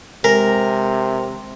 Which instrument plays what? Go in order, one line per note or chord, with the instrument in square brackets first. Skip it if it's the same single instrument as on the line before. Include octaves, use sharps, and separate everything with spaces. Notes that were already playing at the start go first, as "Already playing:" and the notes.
[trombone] C3 [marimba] G#3 A#6 [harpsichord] A#4